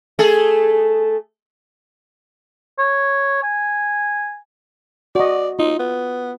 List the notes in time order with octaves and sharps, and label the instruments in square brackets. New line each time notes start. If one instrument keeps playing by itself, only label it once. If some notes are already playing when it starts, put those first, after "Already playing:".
[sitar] A3 G#4 A4
[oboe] C#5
G#5
[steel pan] F#4 D#5 [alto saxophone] D5
[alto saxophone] D#4 [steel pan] F4
[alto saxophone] B3